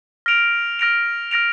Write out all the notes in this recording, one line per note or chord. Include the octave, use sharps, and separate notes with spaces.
F6 A#6 D7 F7
F6 A#6 D7 F7
F6 A#6 D7 F7